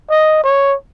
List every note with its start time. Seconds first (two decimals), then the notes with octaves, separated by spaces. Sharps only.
0.10 D#5
0.44 C#5